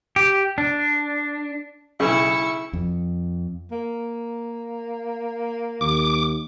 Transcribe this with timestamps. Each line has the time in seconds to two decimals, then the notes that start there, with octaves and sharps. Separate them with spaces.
0.16 G4
0.58 D4
2.00 B1 C#3 E4 C#6 E6
2.73 F2
3.72 A#3
5.81 D#2 D6